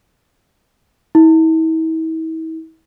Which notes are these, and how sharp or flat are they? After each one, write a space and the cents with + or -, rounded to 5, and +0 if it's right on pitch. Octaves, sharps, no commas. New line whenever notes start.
E4 -40